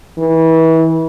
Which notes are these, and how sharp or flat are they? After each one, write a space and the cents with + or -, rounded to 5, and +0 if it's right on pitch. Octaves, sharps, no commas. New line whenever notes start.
E3 -30